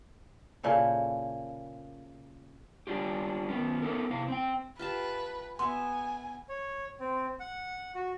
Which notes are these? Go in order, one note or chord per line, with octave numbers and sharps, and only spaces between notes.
A#2 C#3 E4 A4
G3 D4 F4 G4
D#3 B3 C#4
B3 D#4 A4 A#4
C3 E4 F5
C4 G5
F4 G4 B4 A5
B3 E5 G#5 C6
C#5
C4
F#5
F#4